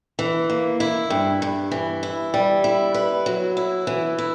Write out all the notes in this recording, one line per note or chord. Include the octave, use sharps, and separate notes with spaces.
E3
A#3
E4
G2
G2
E3
E4
G3
E4
B4
F#3
E4
E3
E4